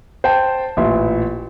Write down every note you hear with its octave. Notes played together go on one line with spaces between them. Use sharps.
C5 G5 A5
A1 A#2 E5 C6